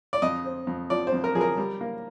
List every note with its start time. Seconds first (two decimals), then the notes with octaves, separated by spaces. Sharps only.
0.13 D5
0.22 F2 D#5
0.45 C4
0.67 F2
0.90 F3 D5
1.07 C5
1.12 F2
1.24 A#4
1.35 F3 G#4
1.41 A#4
1.57 G3
1.81 A#3